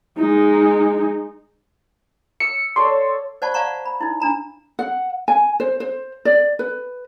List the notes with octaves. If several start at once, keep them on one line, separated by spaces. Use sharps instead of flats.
G#3 D#4
E6 C#7
A4 C#5 D5 C6
C5 D5 F#5 A5 B5 C#6
D5 F5 F#5 A5 A#5 C#6
B5
D#4 E4
D4 A#5 B5
F#5
G#5
C5
C5
D5
B4